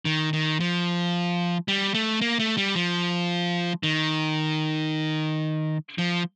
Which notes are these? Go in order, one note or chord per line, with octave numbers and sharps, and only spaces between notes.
D#3
D#3
F3
G3
A3
A#3
A3
G3
F3
D#3
F3